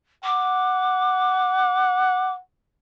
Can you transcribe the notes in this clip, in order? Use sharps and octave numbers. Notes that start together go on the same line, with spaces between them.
F#5 D6